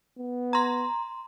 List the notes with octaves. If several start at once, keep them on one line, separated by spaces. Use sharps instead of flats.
B3
A#5 C6